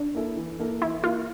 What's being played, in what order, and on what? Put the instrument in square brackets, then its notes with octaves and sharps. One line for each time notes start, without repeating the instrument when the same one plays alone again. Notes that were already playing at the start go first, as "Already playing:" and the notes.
Already playing: [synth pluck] D4
[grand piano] A#3 E4 A4
E3
A#3 E4 A4
[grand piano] E3 [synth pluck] E4
[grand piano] A#3 E4 [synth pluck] F4